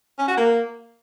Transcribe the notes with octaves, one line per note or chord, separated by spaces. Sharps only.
C#4
F#4
A#3